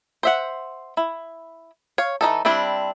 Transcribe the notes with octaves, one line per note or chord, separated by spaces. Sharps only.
C5 E5 F#5
E4
C#5 F5
E3 G#3 D#4 A4
G3 C4 D4 E4